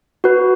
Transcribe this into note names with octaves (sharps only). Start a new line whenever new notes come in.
F#4 B4